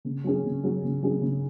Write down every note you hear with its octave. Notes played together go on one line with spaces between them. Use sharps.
C#3
F#3 C#4 G#4
C#3
F#3 C#4 G#4
C#3
F#3 C#4 G#4
C#3